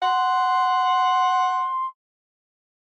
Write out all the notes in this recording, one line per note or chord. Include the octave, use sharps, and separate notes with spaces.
F#5 C6